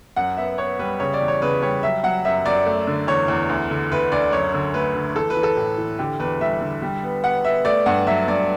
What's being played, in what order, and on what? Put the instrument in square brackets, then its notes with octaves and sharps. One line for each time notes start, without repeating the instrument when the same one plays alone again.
[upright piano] F#2 F#5
B3 E5
B3 C#5
G3 B4
C#3 C#5
D5
E2
C#5
C#3 B4
G3 C#5
F#3 E5
F#3 F#5
F#2 E5
F#2 D5
A3
D3
E2 C#5
E2
D2
D3
D2 B4
D2 D5
F#2 C#5
D3
A3 B4
D3
E3 A4
B4
E3
A4
A2
E3
D3 G4
E2 B4
G3 E5
D3
G3
B3
B3 F#5
B3 E5
A3 D5
G2 F#5
F#3 E5
G2 D5